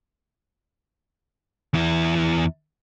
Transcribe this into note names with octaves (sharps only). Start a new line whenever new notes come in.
E2 E4